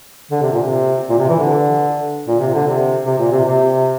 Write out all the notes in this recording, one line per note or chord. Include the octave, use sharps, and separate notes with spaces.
D3
C3
A#2
C3
A#2
C3
E3
D3
A#2
C3
D3
C3
C3
A#2
C3
C3